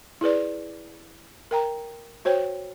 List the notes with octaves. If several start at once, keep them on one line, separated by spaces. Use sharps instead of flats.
E4 G#4 B4 D5
A#4 G5 A#5
F#4 C5 C#5 G5